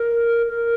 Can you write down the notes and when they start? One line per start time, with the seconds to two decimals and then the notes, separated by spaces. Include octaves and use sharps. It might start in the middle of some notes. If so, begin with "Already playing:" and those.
Already playing: A#4
0.48 A#4